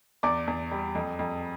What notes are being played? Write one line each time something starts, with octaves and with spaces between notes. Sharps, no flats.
E2 D5 D6
E2
G3
F2
F2